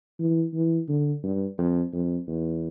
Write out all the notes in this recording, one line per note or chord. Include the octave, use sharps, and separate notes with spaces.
E3
E3
D3
G2
F2
F2
E2